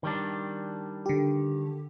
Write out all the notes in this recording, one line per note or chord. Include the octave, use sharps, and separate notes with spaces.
D#3 G3 D4
D3 G4